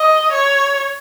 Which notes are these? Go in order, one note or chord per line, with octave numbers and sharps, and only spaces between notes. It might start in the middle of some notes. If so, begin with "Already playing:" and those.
Already playing: D#5
C#5